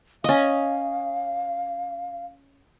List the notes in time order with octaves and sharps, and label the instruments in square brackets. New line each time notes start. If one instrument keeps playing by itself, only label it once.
[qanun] C#4 D#5 [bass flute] F5